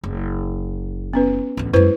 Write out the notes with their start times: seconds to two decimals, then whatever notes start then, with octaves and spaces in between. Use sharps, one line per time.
0.04 F#1
1.13 B3 C#4 B4
1.57 A1 D2
1.73 F#2 G#3 E4 B4 C5